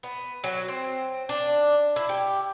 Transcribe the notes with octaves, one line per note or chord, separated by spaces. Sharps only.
B3
F#3
C4
D4
E4
G4